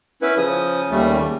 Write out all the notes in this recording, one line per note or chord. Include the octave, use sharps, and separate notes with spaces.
B3 C#4 E4 B4
C#3 F3 D#6
D#2 G3 A3